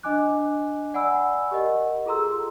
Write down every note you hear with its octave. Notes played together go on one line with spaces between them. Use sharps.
D4 D#5 G#5 D6 F#6
D5 F#5 G#5 B5 E6
G4 A#4 D#5 F#5
F4 G#4 A4 A#5 C6 E6